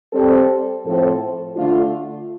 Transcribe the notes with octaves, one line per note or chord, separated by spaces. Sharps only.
G3 C4 A4
A2 F3 C4 A4 C5
D3 A3 D4 F4